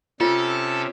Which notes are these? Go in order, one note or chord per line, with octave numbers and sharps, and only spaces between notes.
C3 C#4 F4 A4